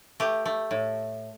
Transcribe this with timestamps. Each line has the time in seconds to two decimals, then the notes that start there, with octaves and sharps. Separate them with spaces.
0.20 A3 G4
0.45 A3
0.71 A2